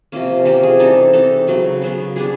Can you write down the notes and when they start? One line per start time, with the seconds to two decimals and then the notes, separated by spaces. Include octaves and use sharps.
0.12 C3 F3 A#3 C#4
0.45 C3 F3 A#3 C#4 G4
0.63 G#4
0.79 E3 G3 C4 D#4 A4
1.13 E3 G3 C4 D#4 A4
1.47 C#3 F#3 B3
1.82 C#3 F#3 B3
2.16 G3 B3 D4 G#4